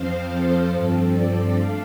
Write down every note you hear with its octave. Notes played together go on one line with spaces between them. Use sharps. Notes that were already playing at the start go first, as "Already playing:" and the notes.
Already playing: F2 F3 C4 C5 F5
A4
G2 F3 C4 A4
A4 D5
A3 D4 F5